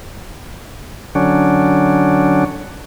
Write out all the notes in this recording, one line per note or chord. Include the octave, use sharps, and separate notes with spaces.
D3 F#3 C#4 D4